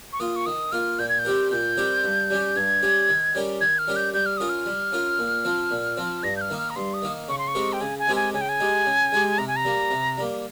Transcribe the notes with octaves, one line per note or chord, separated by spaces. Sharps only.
C#6
A#3 F4 D#6
C#6
D#3 D#6
A#3 F4 F6
A#2 G6
G#6
G6
G3 C4 G4 A#4
A#2 G6
G3 C4 G4 A#4
G2
G3 C#4 G4
G2 G#6
G3 C#4 G4
D#3
G3 C#4 G4 A#4
D#3 G#6
F6
G3 C#4 G4 A#4
G6
G3 G6
F6
C#4 F4 A#4 D#6
F6
G3
C#4 F4 A#4
A#2
F3 C4
A#2
F3 C4
G2 A#6
G6
F6
D#3 A#3 D#4
F6
A#5
G2 C6
D#6
D#3 A#3 D#4
C#3 C#6
C6
C#6
G#3 C4 G4 A#4
G5
C#3 G#5
G#5
G#3 C4 G4 A#4
G#5
C#3 G#5
G5
G#5
G#3 D#4 G4
C#3
G#3 D#4 G4
C3 A#5
G#5
A#5
G3 A#3
C3
G3 A#3